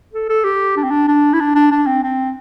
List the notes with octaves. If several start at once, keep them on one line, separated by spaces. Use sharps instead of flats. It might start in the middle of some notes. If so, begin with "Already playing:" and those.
A4
A4
G4
D4
C4
D4
D4
E4
D4
D4
D4
C4
C4